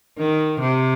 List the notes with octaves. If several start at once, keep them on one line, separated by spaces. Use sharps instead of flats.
D#3
C3